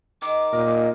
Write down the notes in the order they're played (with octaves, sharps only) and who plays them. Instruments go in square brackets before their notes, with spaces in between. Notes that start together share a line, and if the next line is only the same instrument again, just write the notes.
[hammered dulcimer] D#3 [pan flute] D6
[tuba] A#2 [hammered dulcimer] A#4 [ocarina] D#5